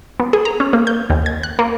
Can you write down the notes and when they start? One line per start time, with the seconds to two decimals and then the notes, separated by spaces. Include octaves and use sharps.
0.20 B3
0.33 G#4
0.45 A#5
0.60 C#4
0.73 A#3
0.87 G6
1.10 D#2
1.26 G#6
1.43 F#6
1.59 A#3